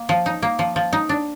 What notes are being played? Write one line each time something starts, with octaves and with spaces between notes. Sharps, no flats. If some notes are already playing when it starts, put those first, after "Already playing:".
Already playing: A#3
F3
D#4
A#3
F3
F3
D#4
D4